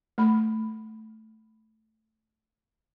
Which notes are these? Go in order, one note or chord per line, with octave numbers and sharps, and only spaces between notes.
A3 B5